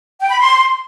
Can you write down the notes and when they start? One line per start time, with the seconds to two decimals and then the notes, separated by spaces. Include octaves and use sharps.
0.19 G5
0.29 B5
0.39 C6